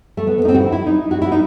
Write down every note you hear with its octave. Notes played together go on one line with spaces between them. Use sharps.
A3
B3
B3
D#4
C4
F#4
E4
E4
D#4
F#4
E4
D#4